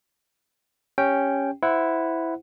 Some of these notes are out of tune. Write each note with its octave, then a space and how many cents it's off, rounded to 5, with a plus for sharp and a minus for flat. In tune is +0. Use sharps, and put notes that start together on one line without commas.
C#4 +0 G4 +15 G5 +0
E4 +0 C5 -20 F#5 +0